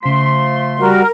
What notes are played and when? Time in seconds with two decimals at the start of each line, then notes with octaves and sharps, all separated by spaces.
0.03 C#3 F3 A3 C6 B6
0.79 G3 F#4 A#4